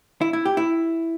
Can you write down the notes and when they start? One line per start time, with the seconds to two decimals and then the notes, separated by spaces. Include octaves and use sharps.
0.21 E4
0.33 E4
0.45 G4
0.57 E4